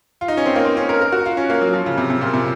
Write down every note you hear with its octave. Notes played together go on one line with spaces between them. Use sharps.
F4
D#4
C#4
C4
A#3
C4
C#4
A#4
A#4
F#4
F4
C#4
A#3
F#3
F3
C#3
C3
C3
A#2
C3